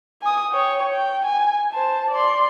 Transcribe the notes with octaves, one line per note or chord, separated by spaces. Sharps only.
G#5 D#6
C#5 G5
G5
G#5
C5 A5
D5 C6